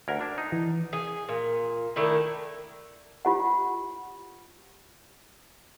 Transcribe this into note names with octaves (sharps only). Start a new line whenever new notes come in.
D2 A#4 F#5 G#6
D4
D#4
E3
G#4
A#2
D#3 A3 D4 E4
F4 G4 F#5